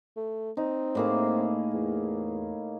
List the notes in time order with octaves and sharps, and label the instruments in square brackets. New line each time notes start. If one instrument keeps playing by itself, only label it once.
[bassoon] A3
[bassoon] C4 [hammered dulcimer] D#4
[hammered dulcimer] A2 A#3 G#4
[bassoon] E2